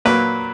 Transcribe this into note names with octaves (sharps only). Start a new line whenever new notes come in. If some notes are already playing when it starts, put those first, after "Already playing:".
A#2 F#3 A#3 B4